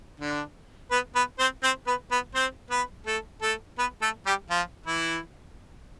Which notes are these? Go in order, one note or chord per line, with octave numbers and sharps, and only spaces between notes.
D3 D4
B3 B4
B3 B4
C4 C5
C4 C5
B3 B4
B3 B4
C4 C5
B3 B4
A3 A4
A3 A4
B3 B4
A3 A4
G3 G4
F3 F4
E3 E4